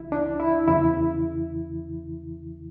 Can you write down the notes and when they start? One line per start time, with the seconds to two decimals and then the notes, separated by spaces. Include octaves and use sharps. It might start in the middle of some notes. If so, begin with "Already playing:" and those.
Already playing: C#2 C#3 E3 E4
0.12 D4
0.40 E4
0.67 E2 C#3 E3 E4